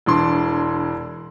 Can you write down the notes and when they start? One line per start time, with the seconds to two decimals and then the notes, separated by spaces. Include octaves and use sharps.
0.06 E1 E3 D4 C6